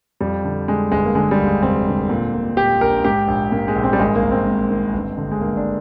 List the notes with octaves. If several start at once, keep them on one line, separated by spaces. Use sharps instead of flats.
F2 G3
D3
D3 G#3
G1 G#3
A#3
D3 G#3
G3
D#2
G#3
F1 C4
D3
A#2
A#2
A#2 G4
A#1 A#4
G#2 G4
A#1
G#2 A#3
G#3
A#1
C4
G3
G#1 G#3
A#3
G#1
C4
G#2
D#3
G1
D3
G#3
G1 A#3
D4